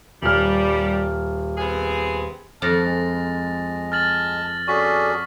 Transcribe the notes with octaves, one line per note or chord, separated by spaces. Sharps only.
D#1 G3 F6
B3 C4 G#4
F2 A5 D#6 F6 A6 A#6
G#3
A5 F6 A6 F#7
C#4 F#4 G#4 A4 D5 C#6 B6